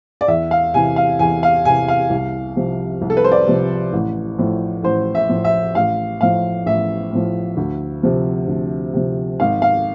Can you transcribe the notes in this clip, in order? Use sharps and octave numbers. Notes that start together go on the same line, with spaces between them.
D5
E2 E5
F5
C3 E3 G#5
F5
E2 G#5
F5
C3 E3 G#5
F5
C2
C3 F3
C2
A4
B4
C5
D5
C3 F3
A1
A2 F3
A1 C5
E5
A2 F3
E5
A1 F5
A2 F3 F5
A1 E5
A2 F3
D2
C3 F3
D2
C3 F3
G#1 F5
F5